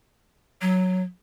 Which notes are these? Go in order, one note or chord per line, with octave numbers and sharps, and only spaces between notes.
F#3